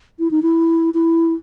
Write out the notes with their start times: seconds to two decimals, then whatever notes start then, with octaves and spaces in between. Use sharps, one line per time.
0.19 E4
0.31 D#4
0.42 E4
0.94 E4